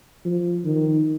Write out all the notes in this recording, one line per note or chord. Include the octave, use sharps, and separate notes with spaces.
F3
D#3